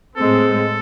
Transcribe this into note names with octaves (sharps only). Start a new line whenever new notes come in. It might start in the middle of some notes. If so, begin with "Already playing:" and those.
A2 G#3 C4 A4